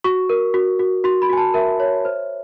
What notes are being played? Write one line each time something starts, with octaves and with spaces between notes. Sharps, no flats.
F#4 C#6
A#4
F#4
F#4
F#4 C6
B5
F#4 G#5
A5
A#4 E5
C#5
C5